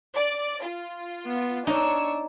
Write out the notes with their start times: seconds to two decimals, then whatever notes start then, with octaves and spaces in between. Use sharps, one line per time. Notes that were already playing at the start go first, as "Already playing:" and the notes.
0.14 D5
0.62 F4
1.26 B3
1.67 D4 D#4 C#5 E6